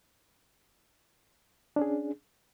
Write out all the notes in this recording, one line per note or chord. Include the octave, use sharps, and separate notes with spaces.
C#4 D4 G#4